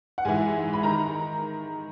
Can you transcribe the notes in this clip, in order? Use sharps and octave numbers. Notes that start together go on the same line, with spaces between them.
F#5
G#2 E3 G#5
B5
D#3 A#5